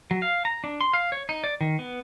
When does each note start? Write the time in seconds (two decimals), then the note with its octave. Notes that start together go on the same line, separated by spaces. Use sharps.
0.11 F#3
0.22 F5
0.45 A#5
0.64 D4
0.81 C6
0.93 F5
1.12 C#5
1.29 D#4
1.44 D5
1.61 D#3
1.79 B3